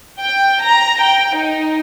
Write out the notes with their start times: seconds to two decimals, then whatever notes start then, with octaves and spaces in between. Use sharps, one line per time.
0.20 G5
0.63 A#5
1.00 G5
1.36 D#4